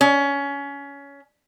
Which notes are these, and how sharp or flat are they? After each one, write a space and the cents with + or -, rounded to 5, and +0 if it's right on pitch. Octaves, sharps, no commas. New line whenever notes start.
C#4 +20